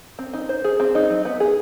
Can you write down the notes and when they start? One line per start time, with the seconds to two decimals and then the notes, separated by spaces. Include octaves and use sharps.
0.19 C4
0.33 D#4
0.49 C5
0.64 G#4
0.80 C4
0.95 D#4
1.10 F#3
1.25 B3
1.40 G#4